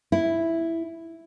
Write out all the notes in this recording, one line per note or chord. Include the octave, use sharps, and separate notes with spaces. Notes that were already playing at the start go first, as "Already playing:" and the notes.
E4